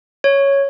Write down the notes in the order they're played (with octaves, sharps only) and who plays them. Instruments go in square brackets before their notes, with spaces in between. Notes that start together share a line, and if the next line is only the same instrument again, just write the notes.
[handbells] C#5